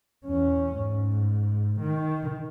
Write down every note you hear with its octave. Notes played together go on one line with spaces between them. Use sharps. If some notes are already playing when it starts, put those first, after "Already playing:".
E2 C#4
G#2
D#3